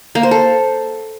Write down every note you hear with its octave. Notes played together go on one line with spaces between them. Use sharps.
A#3
C5
A4